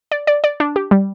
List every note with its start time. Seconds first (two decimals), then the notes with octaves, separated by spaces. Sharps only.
0.12 D5
0.27 D5
0.44 D5
0.60 D4
0.76 G4
0.91 G3